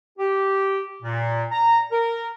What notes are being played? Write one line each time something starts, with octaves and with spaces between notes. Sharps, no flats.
G4
A#2
A#5
A#4